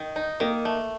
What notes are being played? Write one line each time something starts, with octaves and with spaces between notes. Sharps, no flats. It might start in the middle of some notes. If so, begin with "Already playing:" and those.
Already playing: D#3
D#4
D#3 A#3
A3